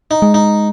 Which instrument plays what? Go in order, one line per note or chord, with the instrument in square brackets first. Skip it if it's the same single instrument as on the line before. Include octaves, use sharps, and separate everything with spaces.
[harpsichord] D#4
[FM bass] G#3
[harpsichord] D#4